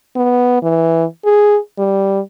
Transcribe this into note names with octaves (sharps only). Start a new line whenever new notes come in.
B3
E3
G#4
G3